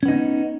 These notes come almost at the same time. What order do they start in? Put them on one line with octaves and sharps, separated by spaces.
C#4 B3 D#4